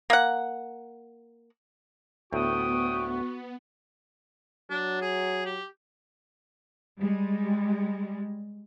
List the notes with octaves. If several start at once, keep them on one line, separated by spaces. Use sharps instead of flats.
A#3 F#5
D2 A2 B3 F#4 G5 C#6 D#6
F#3 D4
G#4
G4
G3 G#3